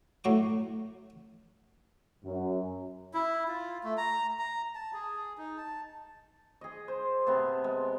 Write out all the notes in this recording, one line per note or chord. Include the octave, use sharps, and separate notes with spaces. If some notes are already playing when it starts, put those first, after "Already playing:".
A2 F#3 C#6 D6
F#2
E4
F4
A3
A#5
A#5
A5
G#4
D#4
A5
G#4 D#5
C5
C3 B3 A5
G#3